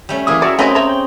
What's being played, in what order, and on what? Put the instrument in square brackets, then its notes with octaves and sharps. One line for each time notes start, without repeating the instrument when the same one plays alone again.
[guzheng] G3 A3 C#4
[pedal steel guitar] E3 A#3 D#6 [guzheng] E4 G#4
[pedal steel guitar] F#4 A#4 E5 [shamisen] D5
[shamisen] A3 F#4 D#5 [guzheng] C4 C#4 D#4 [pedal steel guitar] A#4 B4
[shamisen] C5 C#5 E5 [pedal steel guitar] A#5
[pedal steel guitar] G5